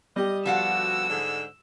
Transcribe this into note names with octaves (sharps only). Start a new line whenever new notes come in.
G3 G4 D#5
B2 D3 F3 F#4 F5 F#5 E6
G#2 D3